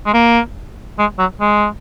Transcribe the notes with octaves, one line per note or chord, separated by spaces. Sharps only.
G#3
A#3
G#3
F#3
G#3